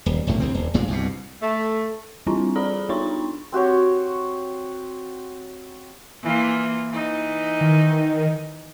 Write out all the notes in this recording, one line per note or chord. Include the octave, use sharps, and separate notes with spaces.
D#1
F1 B1 A2 D3
C2 E3 C4
D#1
F#1 A#2 G#3
C2 G2 B2
A3
E3 G3 C4 D4 E4 F4
G#4 A4 D5 A#5 B5 D#6
B3 D4 D#4 C#5 C6 C#6
C4 F#4 G4 C#5
E3 A#3 F4
E3 D#4
D#3